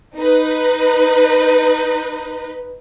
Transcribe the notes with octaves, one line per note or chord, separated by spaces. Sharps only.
D#4 B4